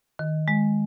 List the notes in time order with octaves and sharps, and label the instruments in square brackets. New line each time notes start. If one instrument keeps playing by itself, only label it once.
[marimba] D#3
G#3